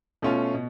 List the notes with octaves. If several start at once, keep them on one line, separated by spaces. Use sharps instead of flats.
B2 A3 C#4 F4
B2